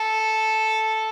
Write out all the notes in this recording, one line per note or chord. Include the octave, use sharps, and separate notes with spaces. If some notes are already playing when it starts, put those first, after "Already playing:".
Already playing: A4